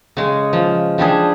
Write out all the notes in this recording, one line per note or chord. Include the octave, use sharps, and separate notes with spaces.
C#3 G#3
F3
F3 G3 D4 G#4